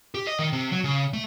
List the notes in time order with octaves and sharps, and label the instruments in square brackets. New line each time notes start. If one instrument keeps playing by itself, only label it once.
[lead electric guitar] G4
D#5
D#3
C3
F#3
C#3
A3